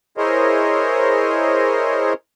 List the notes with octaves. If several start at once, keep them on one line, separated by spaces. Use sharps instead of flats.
E4 G#4 A#4 C5 C#5 D#5